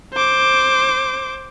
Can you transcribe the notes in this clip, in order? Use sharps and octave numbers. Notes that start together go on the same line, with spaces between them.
C5 D6